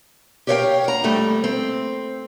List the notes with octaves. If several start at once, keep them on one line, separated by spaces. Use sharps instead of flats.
G4 A#4 C#5 D#5 F5 G5
F#5 A#5
F2 G3 A3
C4